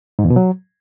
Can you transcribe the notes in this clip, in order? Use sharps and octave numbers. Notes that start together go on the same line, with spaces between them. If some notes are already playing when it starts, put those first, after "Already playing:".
G#2
E2
B2
F#3